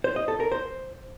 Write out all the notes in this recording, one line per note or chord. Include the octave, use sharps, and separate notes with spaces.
C5
D#5
A4
A#4
C5